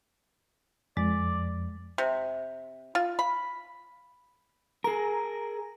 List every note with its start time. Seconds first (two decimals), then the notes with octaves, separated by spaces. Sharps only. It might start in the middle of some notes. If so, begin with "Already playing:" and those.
0.97 F2 G#3 D5
1.98 C3
2.95 F4
3.19 B5
4.84 G#4 A#4 A#5